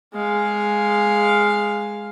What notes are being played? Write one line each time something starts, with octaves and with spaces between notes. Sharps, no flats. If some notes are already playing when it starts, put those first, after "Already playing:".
G#3 F5